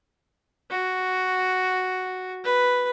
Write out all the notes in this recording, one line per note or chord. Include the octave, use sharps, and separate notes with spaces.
F#4
B4